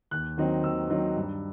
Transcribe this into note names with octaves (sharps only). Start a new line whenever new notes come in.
D#2 F#6
D#3 F#3 C4 D#4
D#2 E6
D#3 F#3 C4 D#4
G2